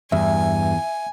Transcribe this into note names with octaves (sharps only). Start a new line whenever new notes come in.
E2 G2 E5 G#5